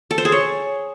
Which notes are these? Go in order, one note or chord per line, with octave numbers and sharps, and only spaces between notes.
A4
C5
G#4
C#5